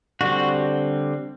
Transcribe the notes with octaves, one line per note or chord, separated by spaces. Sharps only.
D3 G3 C4 F#4